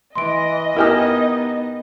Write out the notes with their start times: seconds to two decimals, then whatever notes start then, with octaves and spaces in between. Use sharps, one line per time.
0.15 E3 D#5 C6 D7
0.77 B3 D#4 E4 G4 A#4 G#5 D#6 F6